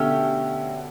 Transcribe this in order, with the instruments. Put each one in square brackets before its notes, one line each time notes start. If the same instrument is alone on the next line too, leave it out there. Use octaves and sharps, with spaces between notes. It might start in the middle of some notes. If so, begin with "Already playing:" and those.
Already playing: [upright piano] B2 D3 [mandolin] A3 C#4 G4